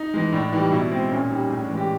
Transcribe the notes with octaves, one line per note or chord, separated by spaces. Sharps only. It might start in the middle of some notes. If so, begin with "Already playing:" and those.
Already playing: D#4
E3 G#3
A2 D4
E3 G3 D#4
B2 E4
G#3 C4
A#2 C#4
G3 D#4
A2 G#4
C#4
D4
E3 G#3
G4